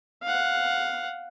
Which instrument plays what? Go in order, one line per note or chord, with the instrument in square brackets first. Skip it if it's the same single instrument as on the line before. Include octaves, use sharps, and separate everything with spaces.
[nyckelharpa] F5 F#5